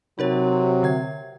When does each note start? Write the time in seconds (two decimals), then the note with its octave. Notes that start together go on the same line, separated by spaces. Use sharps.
0.19 C3 F#3 D#4 A#4 C#5
0.83 D3 E5 G#6